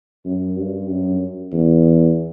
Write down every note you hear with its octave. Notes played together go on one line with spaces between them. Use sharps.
F#2
G2
F#2
E2